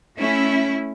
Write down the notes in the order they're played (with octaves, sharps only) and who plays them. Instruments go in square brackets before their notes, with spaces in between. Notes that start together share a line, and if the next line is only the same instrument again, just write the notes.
[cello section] A3 C#4 E4